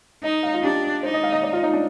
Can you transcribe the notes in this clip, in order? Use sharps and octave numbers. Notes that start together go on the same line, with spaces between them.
D#4 D#5
F5
F4
D4 G4
D#4 C5
D#5
F5
D#5
D5
F4
D#4
D4